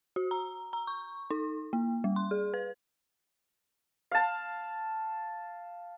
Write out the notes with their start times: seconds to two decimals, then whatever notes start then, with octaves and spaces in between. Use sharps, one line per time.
0.16 F#4
0.31 A#5
0.73 A#5
0.87 C#6
1.31 D#4
1.73 A#3
2.04 G3
2.16 C6
2.31 G#4
2.54 B4
4.11 F5 A5